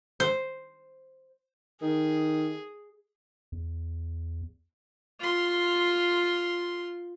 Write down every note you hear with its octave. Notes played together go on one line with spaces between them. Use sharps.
C5
D#3 G#4
E2
F4 C6